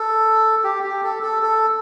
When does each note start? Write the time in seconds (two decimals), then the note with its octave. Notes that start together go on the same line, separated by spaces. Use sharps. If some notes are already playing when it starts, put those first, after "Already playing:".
Already playing: A4
0.64 G4
0.83 G4
1.04 A4
1.23 A4
1.42 A4